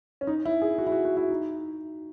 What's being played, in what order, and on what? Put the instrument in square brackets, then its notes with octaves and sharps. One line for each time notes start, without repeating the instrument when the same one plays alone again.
[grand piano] C#4
D#4
E4
G#4
F#4
E4
F#4
F#4
E4
D#4